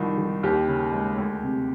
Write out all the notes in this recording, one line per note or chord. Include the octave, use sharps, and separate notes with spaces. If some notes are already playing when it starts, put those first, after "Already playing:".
Already playing: C2 D#3 F3
D#3
D#2 G4
C#3
G#3
D2
C3